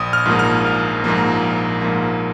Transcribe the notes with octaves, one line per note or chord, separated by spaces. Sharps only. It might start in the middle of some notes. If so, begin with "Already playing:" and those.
Already playing: A#1 D#6
F6
G#2 F3 A#3
F6
A#1
G#2 F3 A#3
A#1
G#2 F3 A#3